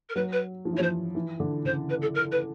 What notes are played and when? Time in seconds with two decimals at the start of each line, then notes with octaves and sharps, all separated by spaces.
0.09 A#4
0.15 F#3 B4
0.32 B4
0.65 F3
0.73 E3
0.77 C#5
0.80 F3 C5
1.15 E3
1.40 D3
1.65 C#3 C5
1.89 B4
2.02 A4
2.15 A#4
2.32 B4